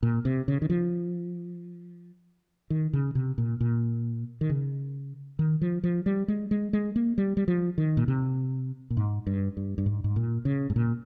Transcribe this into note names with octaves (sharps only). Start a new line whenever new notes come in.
A#2
C3
C#3
D#3
F3
D#3
C#3
C3
A#2
A#2
D#3
C#3
D#3
F3
F3
G3
G#3
G#3
G#3
A#3
G3
G3
F3
D#3
A#2
C3
A#2
G#2
G2
G2
G2
G#2
G#2
A#2
C#3
G#2
A#2